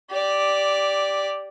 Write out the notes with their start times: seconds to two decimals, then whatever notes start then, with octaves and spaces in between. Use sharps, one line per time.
0.10 G4 D5